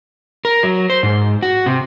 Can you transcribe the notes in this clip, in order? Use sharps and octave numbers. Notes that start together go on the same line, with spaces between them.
A#4
F#3
C5
G#2
F#4
C3